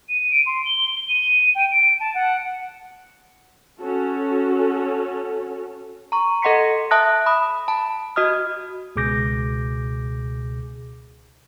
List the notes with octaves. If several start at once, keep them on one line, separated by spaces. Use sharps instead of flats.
D#7
D7
C6
G7
D#7
G5
D7
A5
F#5
C#4 F#4 A4
A#5 C#6
A4 D#5 F#5 C6 B6 C#7
E5 A5 D#6 F#6 A#6
B5 D#6
A5 B5
F#4 D#5 D#6 F6
C#2 B2 G#4 D6 G6 A#6